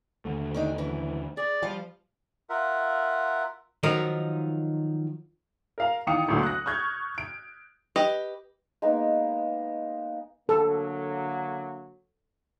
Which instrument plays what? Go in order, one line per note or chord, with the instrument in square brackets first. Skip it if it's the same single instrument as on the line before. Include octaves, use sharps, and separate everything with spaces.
[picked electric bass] D#2 D3 A3
[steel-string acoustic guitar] D#3 D4 D#4
F#2 E3
[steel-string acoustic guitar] G#4 [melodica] D5
[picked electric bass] F3 [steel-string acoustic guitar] G3 F5
[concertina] F4 A#4 E5 F#5
[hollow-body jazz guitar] D#3 F3 F#3 D#4 A#4
[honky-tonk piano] A#4 F5 A#5
E2 D#3 F5 G5 D#6 C#7
D2 A#2 F#3 A3
F#6 A#6
C#6 F6 G6 G#6
D7
[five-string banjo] G4 B4 D#5
[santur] G#3 A#3 B3 D#4
[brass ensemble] D3 F#3 A#3 [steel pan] A4